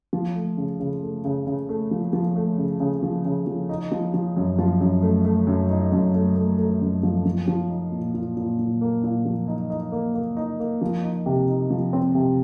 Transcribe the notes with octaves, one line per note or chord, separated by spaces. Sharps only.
F3
A3
C#3
C#3
A3
C#3
C#3
A3
F3
F3
A3
C#3
C#3
F3
C#3
F3
D#4
F3
F3
F#2
F3
F#2
A3
A3
F#2
D#4
F#2
A3
A3
A3
F#2
F3
F3
F3
D#4
A#2
A#2
A#2
A#2
A#3
A#2
F3
D#4
D#4
A#3
A#3
D#4
A#3
F3
D#4
C3
D#4
F3
C4
C3